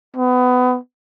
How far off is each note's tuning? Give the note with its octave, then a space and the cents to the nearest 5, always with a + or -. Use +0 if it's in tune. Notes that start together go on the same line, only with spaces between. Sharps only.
B3 +25